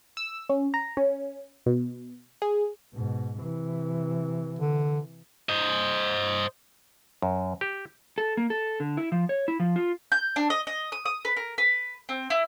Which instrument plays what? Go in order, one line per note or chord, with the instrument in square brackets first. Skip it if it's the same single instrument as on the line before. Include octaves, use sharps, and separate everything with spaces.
[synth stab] E6
C#4
A#5
C#4
B2
G#4
[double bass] G#2 B2
C3 E3
[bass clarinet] D3
[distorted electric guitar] C5 D#5
[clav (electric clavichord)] F#2
G4
[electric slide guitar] A4
A#3
A4
D3
E4
F3
C#5
E4
F3
F4
[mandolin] G6
D4
D#5
D#5
D#6
D#6
B4
A#4
B4
C4
E4